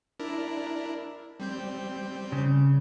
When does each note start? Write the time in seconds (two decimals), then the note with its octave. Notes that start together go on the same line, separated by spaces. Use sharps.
0.20 D4 E4 A#4
1.40 G3 C4 G6
2.32 C#3